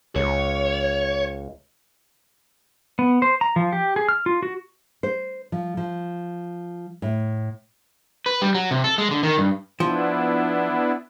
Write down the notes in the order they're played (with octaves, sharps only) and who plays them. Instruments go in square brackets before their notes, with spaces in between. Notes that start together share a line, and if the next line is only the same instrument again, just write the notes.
[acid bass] C#2 [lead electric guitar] C#5
[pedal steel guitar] B3
C5
A#5
F3
G4
G#4
F6
F4
F#4
[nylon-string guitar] C5
F3
F3
A2
[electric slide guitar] B4
G3
F#3
C3
A4
G#3
D3
D#3
G2
[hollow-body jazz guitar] F3 [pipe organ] B3 D4 E4